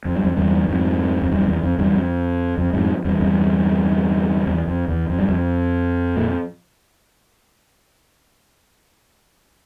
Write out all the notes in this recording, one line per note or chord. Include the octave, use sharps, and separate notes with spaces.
F2
G2
F2
E2 G2
F2 G#2
F2
E2 G2
F2
E2
F2
E2 G2
F2
F2
F2 G#2
E2 G2
E2 G2
E2
F2
E2
F2
G2
F2
A#2